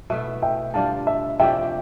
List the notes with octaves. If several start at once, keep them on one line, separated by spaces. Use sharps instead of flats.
B2 A3 E4 E5
E5 G5
D3 G3 D4 F4 F5 A5
E5
C3 F3 A3 D4 E5 G5